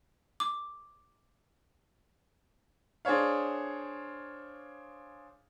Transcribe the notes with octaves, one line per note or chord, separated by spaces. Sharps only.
D6
D4 G#4 C5 C#5 F5